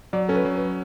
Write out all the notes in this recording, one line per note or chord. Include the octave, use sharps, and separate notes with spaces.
F#3 D5
C#4 A4
B4
F#3
B4